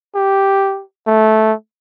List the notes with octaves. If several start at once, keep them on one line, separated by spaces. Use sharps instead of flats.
G4
A3